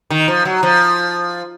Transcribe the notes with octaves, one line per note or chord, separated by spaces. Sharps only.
D#3
F3
F#3
F3